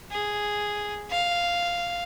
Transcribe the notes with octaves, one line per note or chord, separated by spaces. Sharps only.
G#4
F5